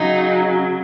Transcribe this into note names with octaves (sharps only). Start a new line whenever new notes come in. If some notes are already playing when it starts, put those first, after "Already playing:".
Already playing: C#3 F#3 D#4